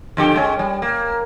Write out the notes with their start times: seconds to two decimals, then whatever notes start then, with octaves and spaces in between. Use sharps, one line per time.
0.17 F2 D3 G4
0.36 G#3 C#4
0.59 G3
0.82 A#3